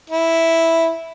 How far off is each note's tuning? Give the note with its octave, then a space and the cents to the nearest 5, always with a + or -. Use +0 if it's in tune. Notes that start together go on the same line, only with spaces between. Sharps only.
E4 -5